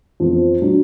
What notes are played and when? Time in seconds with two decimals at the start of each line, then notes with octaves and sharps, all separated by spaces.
0.20 F2 F3 B3
0.62 F#3 D4